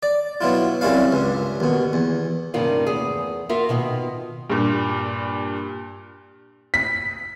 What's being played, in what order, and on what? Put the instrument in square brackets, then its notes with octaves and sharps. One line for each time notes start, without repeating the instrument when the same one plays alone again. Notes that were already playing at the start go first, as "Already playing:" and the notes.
[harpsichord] D5
B2 F#3 E4 F4
C2 F#2 G3 C#4 E4 F5
C#2 G2
D#2 B2
E2
[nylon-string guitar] G2 C3 D#3 A#3 C#4 F4
E2 A3 G#4
A#3 F4 F#4 A#4 E5
B2 D#3 F4
[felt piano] G2 A#2
[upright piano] B6